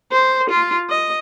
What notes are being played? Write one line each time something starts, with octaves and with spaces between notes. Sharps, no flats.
C5
F4
D#5